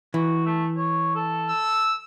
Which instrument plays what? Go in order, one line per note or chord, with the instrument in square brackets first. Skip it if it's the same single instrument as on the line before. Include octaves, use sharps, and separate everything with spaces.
[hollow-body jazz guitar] E3 [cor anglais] F#4
[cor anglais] A3
C#5
A4
[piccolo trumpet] E6